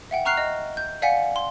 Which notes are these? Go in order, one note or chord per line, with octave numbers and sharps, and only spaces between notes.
E5 F#5 G5
A#5 C#6 F6 F#6 C7 F7
D#5
G6
D5 F5 F#5 G#5 B6 C#7
C6